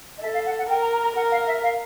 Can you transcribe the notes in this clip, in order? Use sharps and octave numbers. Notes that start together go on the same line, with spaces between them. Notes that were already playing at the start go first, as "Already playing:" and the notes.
D#5
A4 E5
F5
F#5
F#5
A#4 G5
A#5
A#5
A#5
A#4 F#5
F5
E5
F5